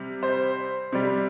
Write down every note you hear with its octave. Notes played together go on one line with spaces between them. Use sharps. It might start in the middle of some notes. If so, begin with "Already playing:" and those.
Already playing: C3 G3
C5
C3 G3